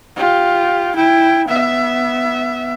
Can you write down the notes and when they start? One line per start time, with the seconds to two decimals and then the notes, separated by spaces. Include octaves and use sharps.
0.16 F4 G4
0.95 E4 G5
1.48 B3 E5